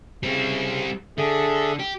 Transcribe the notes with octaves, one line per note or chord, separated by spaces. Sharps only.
C#3 G3 C4
D3 G#4 A4 E5
G4